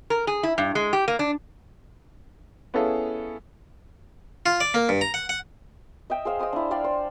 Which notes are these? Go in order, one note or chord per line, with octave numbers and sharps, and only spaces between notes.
A#4
G#4
E4
G2
G#3
G4
A#3
D4
B3 C#4 E4 G#4 A4 F5
F4
D5
A#3
G2
A#5
F#5
F#5
D#5 E5 G5
G#4 C5 F5
D#5 G5 C6 D#6
D4 E4
D5 F5 G5 C6
C5